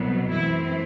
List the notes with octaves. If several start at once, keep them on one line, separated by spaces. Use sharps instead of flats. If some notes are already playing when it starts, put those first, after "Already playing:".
Already playing: C2 B2 F#3 B3
F#2 E3 A3 C4 E4